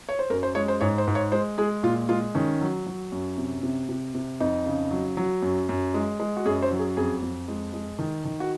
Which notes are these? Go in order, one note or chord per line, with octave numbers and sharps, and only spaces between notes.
C#5
C5
F#2 A#4
C5
G#3 C#5
C5
G#2 C#5
C5
G#2
C#5
G#3 C5
G#3 G#4
A#2 F4
G#3 F4
D#3 C#4
F#3
F#3
F#2
C3
C3
C3
C3
F2 D#4
C#3
F#3
F#3
F#2
F#2
G#3
G#3
F#4
F#2 G#4
C5
F#3
G#4
F2 G#4
F2
G#3
G#3
D#3
D#3
F#4